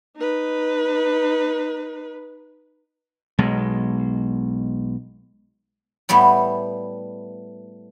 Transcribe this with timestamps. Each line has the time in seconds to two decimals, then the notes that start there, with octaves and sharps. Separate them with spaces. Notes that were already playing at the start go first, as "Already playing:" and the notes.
0.17 D#4 B4
3.39 B1 B2 G#3
6.09 A2 G3 A3 B3